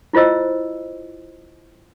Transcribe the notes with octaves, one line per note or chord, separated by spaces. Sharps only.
E4 F4 C5 D#5 E6